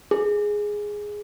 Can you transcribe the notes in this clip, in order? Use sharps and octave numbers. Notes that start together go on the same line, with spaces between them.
G#4